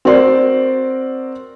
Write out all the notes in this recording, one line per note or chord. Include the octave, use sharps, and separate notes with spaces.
C4 F#4 A#4 D5 C6